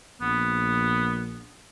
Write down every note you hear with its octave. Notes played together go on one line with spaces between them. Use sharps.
A#1 B3